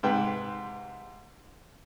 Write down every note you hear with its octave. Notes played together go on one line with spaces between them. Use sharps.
G#2 C3 B4 G5